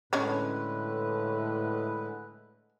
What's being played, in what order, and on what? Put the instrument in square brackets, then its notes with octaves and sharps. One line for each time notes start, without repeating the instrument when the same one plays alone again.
[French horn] A2 [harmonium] D3 G#3 B4 [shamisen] C#4 D4 C#5